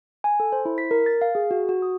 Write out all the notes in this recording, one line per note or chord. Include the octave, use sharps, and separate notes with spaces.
G#5
A4
C5
E4
B6
A#4
A6
F5
G#4
F#4
F#4
D#6